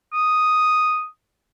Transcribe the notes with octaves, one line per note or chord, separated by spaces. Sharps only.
D#6